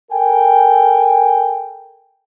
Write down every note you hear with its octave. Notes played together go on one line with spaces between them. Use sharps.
A4 A#4 G5 G#5